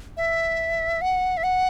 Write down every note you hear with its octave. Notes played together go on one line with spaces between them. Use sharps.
E5
F#5
E5
F#5